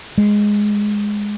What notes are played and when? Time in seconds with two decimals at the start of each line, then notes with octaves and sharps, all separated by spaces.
0.18 G#3